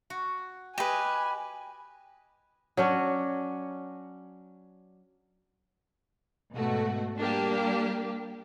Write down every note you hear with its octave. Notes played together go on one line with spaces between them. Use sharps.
F#4
G4 B4 D#5 G#5
F#3 C#4 D4
G#2 B2 A3 F#4
G3 A#3 D4 G4